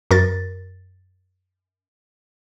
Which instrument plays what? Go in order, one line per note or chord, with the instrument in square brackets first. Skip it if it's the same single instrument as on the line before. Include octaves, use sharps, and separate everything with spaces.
[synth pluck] F#2 A#4 A6